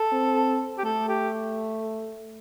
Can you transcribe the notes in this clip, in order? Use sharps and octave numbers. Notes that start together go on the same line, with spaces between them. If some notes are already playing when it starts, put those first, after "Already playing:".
Already playing: A4
C4
G4
A3 A4
G4